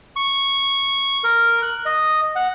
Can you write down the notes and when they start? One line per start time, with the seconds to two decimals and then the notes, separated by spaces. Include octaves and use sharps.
0.16 C#6
1.24 A#4
1.62 F#6
1.86 D#5
2.36 F#5